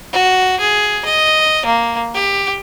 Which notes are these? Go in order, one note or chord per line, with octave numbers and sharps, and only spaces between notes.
F#4
G#4
D#5
A#3
G4